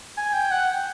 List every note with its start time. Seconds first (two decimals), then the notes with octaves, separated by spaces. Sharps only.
0.17 G#5
0.33 G5
0.51 F#5